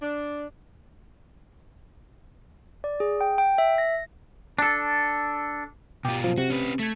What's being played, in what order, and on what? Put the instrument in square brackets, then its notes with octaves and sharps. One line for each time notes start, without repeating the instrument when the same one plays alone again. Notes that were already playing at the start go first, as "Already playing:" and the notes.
[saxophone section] D4
[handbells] D5
G#4
G5
G5
E5
A#6
[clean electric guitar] D4 A4
[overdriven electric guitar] B2 F4 [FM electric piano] G4
[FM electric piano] F#2 F3
[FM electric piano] C3 [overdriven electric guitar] F#4
[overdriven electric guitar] C#4 B4
[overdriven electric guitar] A3 [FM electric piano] G#6 B6